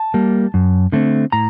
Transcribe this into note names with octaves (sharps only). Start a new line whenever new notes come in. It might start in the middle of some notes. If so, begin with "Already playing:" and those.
Already playing: A5
G3 A#3
F#2
D3 A3 C4
A2 A#5